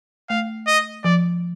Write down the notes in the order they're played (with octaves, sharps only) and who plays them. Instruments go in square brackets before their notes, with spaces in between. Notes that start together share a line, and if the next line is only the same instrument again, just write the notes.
[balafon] A3 [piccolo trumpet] F5
[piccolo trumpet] D#5
[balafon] F3 [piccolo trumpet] D5